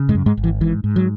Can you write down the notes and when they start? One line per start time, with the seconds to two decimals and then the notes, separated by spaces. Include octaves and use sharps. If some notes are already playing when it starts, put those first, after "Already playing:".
Already playing: C#3
0.09 G#2 G#3
0.15 F#2
0.26 G#2 G#3
0.37 G#1
0.44 E3
0.61 G#2 E3
0.84 G#2
0.96 F#3